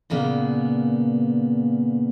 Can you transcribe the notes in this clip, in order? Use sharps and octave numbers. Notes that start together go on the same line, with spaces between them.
A#2 C#3 A#3 B3 D4